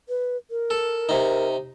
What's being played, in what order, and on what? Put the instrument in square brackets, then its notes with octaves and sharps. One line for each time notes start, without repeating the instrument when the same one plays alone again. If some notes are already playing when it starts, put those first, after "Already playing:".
[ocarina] B4
A#4
[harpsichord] A4
C3 D#4